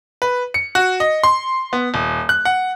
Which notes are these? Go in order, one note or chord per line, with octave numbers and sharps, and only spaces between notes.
B4
C#7
F#4
D#5
C6
B3
D#1
F#6
F#5